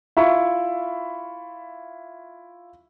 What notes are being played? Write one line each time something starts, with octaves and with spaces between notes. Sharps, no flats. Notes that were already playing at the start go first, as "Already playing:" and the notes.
E4 F4 E5 B5 C#6